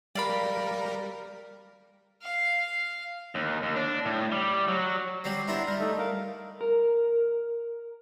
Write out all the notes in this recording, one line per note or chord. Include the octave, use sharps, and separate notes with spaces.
G3 A#4 D5 F5 B5
F5
D#2
D#2
D4
A2
G3
F#3
F#3 G3 C4 G4
B3 D4 E4 E5 A#5 C6
G3 A#5 F6
A3 D#4 E5
A#4 F5
A#4